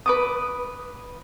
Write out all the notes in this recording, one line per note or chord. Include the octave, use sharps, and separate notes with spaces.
B4 D6 D#6